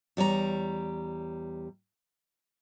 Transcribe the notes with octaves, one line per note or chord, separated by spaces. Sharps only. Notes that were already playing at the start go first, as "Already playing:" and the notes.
E2 G3 C#5 A#5